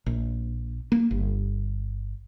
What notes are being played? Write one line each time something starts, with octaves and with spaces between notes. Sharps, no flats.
A#1
A#3
G1